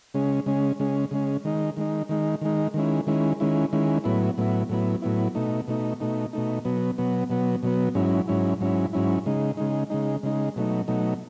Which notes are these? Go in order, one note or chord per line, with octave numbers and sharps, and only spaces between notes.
C#3 G#3 C#4
C#3 G#3 C#4
C#3 G#3 C#4
C#3 G#3 C#4
D#3 G#3 D#4
D#3 G#3 D#4
D#3 G#3 D#4
D#3 G#3 D#4
D#3 G#3 C#4 E4
D#3 G#3 C#4 E4
D#3 G#3 C#4 E4
D#3 G#3 C#4 E4
A2 F#3 B3 E4
A2 F#3 B3 E4
A2 F#3 B3 E4
A2 F#3 B3 E4
B2 A3 D#4
B2 A3 D#4
B2 A3 D#4
B2 A3 D#4
B2 F#3 B3
B2 F#3 B3
B2 F#3 B3
B2 F#3 B3
G#2 F#3 C#4 E4
G#2 F#3 C#4 E4
G#2 F#3 C#4 E4
G#2 F#3 C#4 E4
C#3 G#3 D#4
C#3 G#3 D#4
C#3 G#3 D#4
C#3 G#3 D#4
B2 F#3 A3 D#4
B2 F#3 A3 D#4